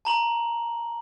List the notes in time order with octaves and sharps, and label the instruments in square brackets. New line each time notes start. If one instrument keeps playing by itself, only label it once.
[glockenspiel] A5 A#5 F#7